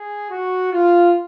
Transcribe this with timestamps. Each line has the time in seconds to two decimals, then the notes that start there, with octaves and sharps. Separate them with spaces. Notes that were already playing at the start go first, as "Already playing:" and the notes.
Already playing: G#4
0.30 F#4
0.72 F4